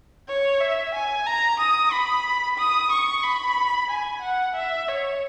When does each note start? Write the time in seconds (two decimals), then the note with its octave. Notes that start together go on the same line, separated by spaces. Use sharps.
0.28 C#5
0.61 E5
0.94 G#5
1.26 A#5
1.60 D#6
1.92 B5
2.58 D#6
2.92 C#6
3.23 B5
3.89 G#5
4.22 F#5
4.55 E5
4.88 C#5